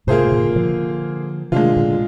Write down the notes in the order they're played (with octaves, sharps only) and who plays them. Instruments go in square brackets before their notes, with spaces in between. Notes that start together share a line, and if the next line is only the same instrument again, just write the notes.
[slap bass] G#2 C3 [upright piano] A#3 F4 G#4 C5
[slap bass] A#2 D3
D3 F3
[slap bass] C3 D#3 [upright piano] G#3 D4 F4
[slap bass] A#2 D3